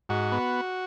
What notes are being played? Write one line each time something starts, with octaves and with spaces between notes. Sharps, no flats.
G#2 F#4
B3